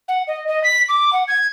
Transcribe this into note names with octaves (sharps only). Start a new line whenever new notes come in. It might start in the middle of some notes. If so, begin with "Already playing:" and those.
F#5
D#5
D#5
B6
D6
F#5
G#6